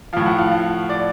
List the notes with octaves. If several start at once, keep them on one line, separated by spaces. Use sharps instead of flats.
A2 F3 F5
F#5
F5
F5
D5